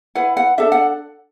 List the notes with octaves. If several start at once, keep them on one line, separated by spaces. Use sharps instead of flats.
E4 B4 F#5
F#5
D4 A4 E5
F#5